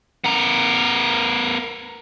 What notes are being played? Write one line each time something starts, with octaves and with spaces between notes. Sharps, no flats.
B3 A#4